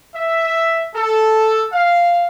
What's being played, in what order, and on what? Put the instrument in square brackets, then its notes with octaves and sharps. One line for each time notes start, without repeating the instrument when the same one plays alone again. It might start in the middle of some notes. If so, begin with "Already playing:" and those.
[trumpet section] E5
A4
F5